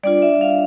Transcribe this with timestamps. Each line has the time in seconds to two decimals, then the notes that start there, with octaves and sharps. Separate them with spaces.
0.03 G3 D4 F4 D5
0.22 E5
0.41 F5